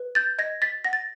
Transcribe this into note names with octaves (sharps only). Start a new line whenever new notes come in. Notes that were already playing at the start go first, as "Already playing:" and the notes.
Already playing: B4
G6 A6
D#5 G#6 A#6
A6 B6
F#5 A#6
A6